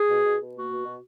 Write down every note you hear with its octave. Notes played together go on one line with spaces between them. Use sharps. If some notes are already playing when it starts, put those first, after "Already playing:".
Already playing: G#4
B2
B2
B2
A#3 F#4
B2
B2